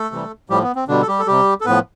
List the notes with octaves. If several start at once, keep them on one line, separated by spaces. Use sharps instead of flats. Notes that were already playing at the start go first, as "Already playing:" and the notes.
Already playing: A3 A4
C3 E3 G3
A2 F3 G3 G4
B3
C4
B2 D3 G3 D4
A4
G3 G4
A4
C3 G3 G4
A4
A2 F3 B3 B4